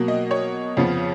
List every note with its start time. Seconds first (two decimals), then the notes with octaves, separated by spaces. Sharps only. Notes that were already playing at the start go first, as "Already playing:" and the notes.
Already playing: B2 F#3 A#3
0.08 D#5
0.31 C#5
0.77 F2 C#3 F3 B3